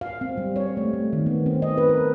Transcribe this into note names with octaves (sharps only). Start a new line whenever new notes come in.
F5
C4
G3
C#5
A3
A3
D#3
B3
C4
D#5
B4
A#4